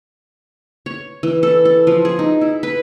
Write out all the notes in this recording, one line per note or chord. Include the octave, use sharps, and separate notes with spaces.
C#5
E3
A4
A4
F3
G#4
D#4
E4
B4